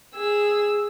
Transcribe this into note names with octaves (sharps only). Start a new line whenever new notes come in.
G#4 E6